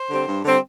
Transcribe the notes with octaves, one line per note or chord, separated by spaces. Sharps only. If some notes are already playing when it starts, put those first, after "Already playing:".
Already playing: C5
D3 G3 C4
G2
D3 G3 C4